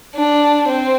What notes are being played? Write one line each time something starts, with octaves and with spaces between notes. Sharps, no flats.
D4
C4